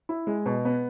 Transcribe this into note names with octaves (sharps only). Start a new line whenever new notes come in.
E4
G#3
B2
B3